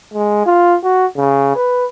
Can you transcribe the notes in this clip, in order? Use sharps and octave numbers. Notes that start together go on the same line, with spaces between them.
G#3
F4
F#4
C#3
B4